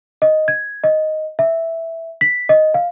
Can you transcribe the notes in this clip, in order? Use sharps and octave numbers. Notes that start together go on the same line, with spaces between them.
D#5
G#6
D#5
E5
B6
D#5
F5